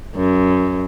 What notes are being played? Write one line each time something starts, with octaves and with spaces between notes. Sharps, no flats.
F#2